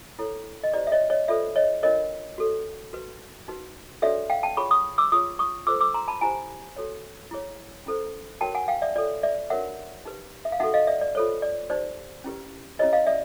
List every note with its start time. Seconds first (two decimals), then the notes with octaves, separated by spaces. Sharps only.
0.19 E4 A4 C#5
0.64 D#5
0.74 E4 G4 C5 D5
0.87 E5
0.92 C#5 D#5
1.10 C#5 D#5
1.28 F4 A4 C5 D5 E5
1.56 C#5 D#5
1.83 D4 F4 A#4 C#5 D#5
2.38 F#4 A4 C#5
2.93 F#4 B4
3.48 D#4 F#4 B4
4.02 D4 F#4 A4 C#5 D5 E5
4.30 F5 G5
4.43 G5 A5
4.57 F4 G#4 C#5 B5 C#6
4.71 C#6 D#6
4.98 D6 E6
5.12 F4 G#4 C#5 C#6 D#6
5.39 C#6 D#6
5.67 F4 A4 C5 D6 E6
5.81 D6 E6
5.94 A#5 C6
6.08 A5 B5
6.21 E4 G4 C5 G#5 A#5
6.76 F#4 A4 C#5
7.31 E4 G#4 C#5
7.86 C#4 E4 A4 C5
8.41 D#4 F#4 A#4 C#5 G5 A5
8.55 F#5 G#5
8.68 F5 G5
8.82 D5 E5
8.95 F4 A4 C#5 D5
9.23 D5 E5
9.50 D4 F#4 A#4 C#5 E5 F#5
10.05 D#4 G4 B4
10.45 E5
10.52 F5
10.60 D#4 F#4 A4 E5 F#5
10.74 D#5 F5
10.87 D5 E5
11.01 D5
11.15 F4 A4 C5 C#5
11.42 D5
11.70 D#4 G4 C5 D5
12.24 C#4 E4 G4 B4
12.79 C#4 E4 G4 B4 C#5 D#5
12.93 D#5 F5
13.07 D5 E5